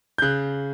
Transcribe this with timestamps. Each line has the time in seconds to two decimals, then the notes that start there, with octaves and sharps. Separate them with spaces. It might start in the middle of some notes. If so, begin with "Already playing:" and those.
0.18 G6
0.22 C#3 F#6